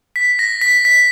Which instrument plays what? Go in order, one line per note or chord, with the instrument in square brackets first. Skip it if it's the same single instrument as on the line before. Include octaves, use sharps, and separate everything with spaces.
[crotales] B6
A#6
B6
B6